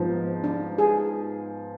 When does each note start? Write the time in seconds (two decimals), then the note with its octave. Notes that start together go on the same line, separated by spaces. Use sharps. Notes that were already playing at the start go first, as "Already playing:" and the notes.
Already playing: G#2 F3 B3 C4 D#4
0.44 D4
0.78 G#4